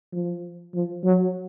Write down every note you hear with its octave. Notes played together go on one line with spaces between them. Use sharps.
F3
F3
F#3